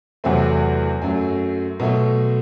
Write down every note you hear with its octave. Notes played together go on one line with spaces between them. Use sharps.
E2 C3 F#3 A3 C4
F#2 F#3 A3
B2 F#3 A3